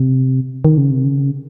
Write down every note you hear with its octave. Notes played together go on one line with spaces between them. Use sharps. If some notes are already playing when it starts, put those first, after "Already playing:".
Already playing: C3
D#3
C#3
C3
C#3